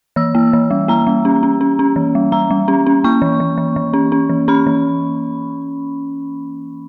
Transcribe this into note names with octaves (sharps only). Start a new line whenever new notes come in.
E3 E6
A#3
E3
G3
A#3 A#5
G3
C#4
C#4
C#4
C#4
E3
G3
G3 A#5
G3
C#4
C#4
A#3 C#6
E3
E3
E3
E3
C#4
C#4
E3
C#4 B5
E3